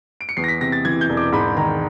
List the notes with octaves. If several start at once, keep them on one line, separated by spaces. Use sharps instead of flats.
D7
C#7
E2 C7
A#6
B6
C3 A#6
A6
E3 G#6
G6
E1
D6
G#2 B5
D#3 A#5